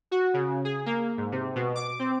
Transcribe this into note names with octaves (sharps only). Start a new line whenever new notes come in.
F#4
C#3
G#4
A#3
G#2
C3
B2
D6
C4